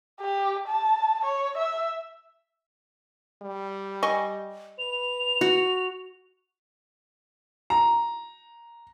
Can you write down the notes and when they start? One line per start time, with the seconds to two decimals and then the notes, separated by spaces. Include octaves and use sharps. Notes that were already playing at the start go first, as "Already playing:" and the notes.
0.20 G4
0.68 A5
1.25 C#5
1.57 E5
3.42 G3
4.03 D#5 G#5 C#6
4.79 B4 F7
5.41 F#4
7.70 A#5